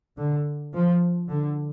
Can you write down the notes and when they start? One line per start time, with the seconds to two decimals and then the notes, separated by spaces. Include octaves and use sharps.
0.18 D3
0.74 F3
1.30 D3